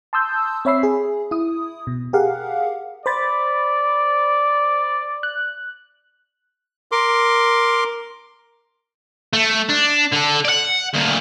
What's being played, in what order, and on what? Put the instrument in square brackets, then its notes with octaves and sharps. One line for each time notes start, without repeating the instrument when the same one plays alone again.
[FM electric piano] A5 C6 D#6 E6 G6
C4 C#5 E5 B5 E6 C7
G#4
E4 D#6
B2
G4 G#4 A#4 F5 F#5
[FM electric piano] C5 B5 A6 [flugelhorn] D5
[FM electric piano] F#6
[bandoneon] A#4 C6 D6
[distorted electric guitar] A3
D4
D3 A4
D5 F#5
D2 A#2